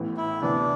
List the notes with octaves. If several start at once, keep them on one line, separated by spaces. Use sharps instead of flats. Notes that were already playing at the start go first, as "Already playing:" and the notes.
Already playing: A1 A2 E3 B3
E4
D2 C3 E3 B3 D4